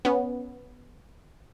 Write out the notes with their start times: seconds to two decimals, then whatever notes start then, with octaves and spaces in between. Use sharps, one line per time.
0.05 B3 C#4